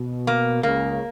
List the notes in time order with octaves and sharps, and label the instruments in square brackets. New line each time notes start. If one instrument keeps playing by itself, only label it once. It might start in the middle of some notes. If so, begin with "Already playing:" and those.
Already playing: [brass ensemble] B2
[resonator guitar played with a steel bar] A#3
[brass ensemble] C#2 C#3 [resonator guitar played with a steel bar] A#3